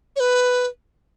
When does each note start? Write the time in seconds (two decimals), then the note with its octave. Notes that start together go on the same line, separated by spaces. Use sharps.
0.16 C#5
0.20 B4